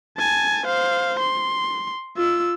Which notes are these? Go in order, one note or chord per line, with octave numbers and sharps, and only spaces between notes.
G#5 A5
C5 F5
C6
F4 E6